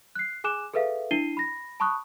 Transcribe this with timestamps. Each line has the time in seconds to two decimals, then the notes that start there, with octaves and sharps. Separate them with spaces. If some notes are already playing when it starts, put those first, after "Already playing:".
0.15 F#6 C7
0.44 G#4 G#5 D6 F#6 E7
0.73 G#4 A4 B4 E5 F5
1.11 D4 E4 C7 D#7 G7
1.37 B5 A#6
1.80 A5 B5 C#6 D#6 F#6